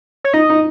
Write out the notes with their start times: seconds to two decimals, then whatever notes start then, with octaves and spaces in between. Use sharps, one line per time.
0.24 C#5
0.34 D#4 D#5
0.50 D#4